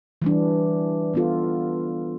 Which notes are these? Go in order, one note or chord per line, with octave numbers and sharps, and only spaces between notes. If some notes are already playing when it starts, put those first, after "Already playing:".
E3 G3 D4
E3 B3 F4 A4